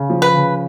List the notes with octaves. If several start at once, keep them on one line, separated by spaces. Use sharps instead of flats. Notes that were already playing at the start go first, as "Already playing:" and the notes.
Already playing: C#3
F3
B4
C#3